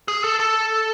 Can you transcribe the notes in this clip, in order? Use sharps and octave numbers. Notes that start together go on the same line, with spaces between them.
G#4
A4
A4